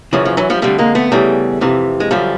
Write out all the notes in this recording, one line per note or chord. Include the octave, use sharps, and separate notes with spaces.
F#2 C#3 E3 F3
F3
E3 F#3
F3 G3
F2 D3 G3 A3
G#3 A#3
A3 B3
E2 C#3 E3 G3 A3
F2 C3 E3
G#3
F#2 D3 F3 G3